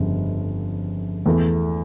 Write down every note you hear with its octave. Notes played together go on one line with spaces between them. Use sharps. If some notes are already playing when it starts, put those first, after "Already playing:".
Already playing: G1 F2 C#3
E2 E3 A3